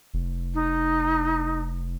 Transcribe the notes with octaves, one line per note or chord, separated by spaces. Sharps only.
F1
D#4